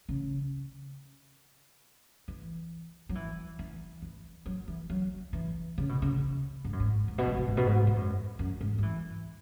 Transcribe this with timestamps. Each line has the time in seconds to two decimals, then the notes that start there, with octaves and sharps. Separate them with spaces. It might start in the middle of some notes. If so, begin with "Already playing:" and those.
0.09 C#3
2.28 E3
3.09 F#3
3.15 E3
3.59 E3
4.02 E3
4.46 F#3
4.68 E3
4.90 F#3
5.33 E3
5.78 C#3
5.89 B2
6.02 C#3
6.64 G#2
6.73 F#2
6.80 G#2
7.08 G#2
7.18 B2
7.27 G#2
7.37 B2
7.48 G#2
7.57 B2
7.66 G#2
7.87 G#2
7.96 F#2
8.39 F#2
8.61 G#2
8.78 F#3
8.83 E3